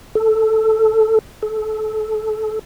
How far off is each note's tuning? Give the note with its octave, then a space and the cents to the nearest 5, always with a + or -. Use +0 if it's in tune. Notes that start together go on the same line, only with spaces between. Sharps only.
A4 +0
A4 -25